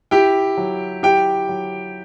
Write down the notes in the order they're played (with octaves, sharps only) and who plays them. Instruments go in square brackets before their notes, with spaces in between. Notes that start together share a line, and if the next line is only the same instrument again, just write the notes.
[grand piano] E4 G4 G5
F#3
E4 G4 G5
F#3